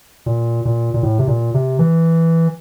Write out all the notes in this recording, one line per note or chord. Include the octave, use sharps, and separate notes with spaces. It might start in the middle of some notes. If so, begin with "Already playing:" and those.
A#2
A#2
A#2
A2
C3
A#2
C3
E3